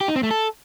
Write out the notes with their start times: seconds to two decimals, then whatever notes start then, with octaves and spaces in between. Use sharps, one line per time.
0.01 G4
0.08 D#4
0.16 C4
0.23 A3
0.31 A4